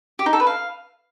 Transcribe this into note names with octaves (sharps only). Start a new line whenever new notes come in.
G4
D#4
A4
B4
F5